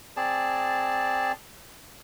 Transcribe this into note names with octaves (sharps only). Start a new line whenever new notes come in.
C4 G#4 D5 A5